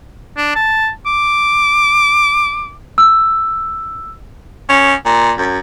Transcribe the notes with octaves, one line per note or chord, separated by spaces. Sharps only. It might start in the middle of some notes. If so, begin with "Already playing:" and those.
D4
A5
D6
E6
C#4
A#2
F#2